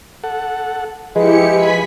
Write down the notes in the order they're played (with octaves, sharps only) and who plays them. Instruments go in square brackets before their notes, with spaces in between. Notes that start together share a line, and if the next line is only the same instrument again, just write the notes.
[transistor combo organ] A4 F#5
[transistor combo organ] F3 G#4 B4 [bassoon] G#3 [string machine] E4 G4 C#7
[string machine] G#5 B5 B6